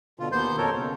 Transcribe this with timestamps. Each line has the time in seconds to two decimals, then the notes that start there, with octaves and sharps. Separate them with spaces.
0.20 B2 D3 F4
0.32 D#2 A#3 B3 C5 C6 G6
0.57 F2 B2 F3 A4 A#4 C#5
0.78 C#3